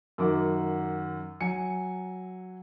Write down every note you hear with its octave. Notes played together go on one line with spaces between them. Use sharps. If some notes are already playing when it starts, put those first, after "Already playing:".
F#2 D#3 F#4 F#5 D6
F#3 G#5 C#7